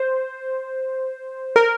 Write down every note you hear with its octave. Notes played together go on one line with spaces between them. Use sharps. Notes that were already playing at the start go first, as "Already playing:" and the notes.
Already playing: C5
A#4